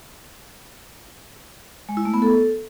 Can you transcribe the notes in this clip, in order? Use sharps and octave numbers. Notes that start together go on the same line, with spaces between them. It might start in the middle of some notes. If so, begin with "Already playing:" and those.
G#3
E4
A3
B3
A4